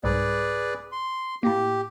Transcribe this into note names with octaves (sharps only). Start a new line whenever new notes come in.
C2 G#2 G#4 B4 D5
C6
A2 A#3 G4